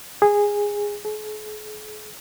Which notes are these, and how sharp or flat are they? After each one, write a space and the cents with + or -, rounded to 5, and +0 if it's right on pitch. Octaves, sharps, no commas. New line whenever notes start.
G#4 -15
G#4 +45